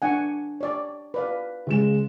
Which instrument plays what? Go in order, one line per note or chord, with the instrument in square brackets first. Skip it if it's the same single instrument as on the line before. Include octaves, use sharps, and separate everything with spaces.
[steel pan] D4 F#5 G#5
C#5 D5
B4 D5 F5
[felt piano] C#3 G#3 E7